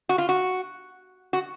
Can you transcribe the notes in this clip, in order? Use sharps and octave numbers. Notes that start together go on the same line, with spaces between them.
F#4
F4
F#4
F#4